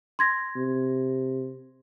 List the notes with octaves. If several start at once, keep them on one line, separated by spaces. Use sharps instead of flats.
C6 G#6 A#6
C3